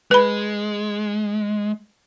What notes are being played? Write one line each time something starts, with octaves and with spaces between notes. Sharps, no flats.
G#3 B4 B5